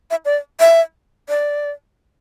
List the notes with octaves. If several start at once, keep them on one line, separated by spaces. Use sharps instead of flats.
E5
D5
E5
D5